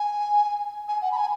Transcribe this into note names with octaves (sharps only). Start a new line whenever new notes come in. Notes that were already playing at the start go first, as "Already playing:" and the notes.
Already playing: G#5
G#5
F#5
B5
G#5